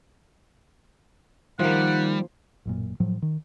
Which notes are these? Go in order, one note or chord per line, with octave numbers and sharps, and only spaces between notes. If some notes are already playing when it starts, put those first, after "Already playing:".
D#3 F3 G3 A#3 F#5
A1 F#2 A#2
A2 F3 F#3
D#3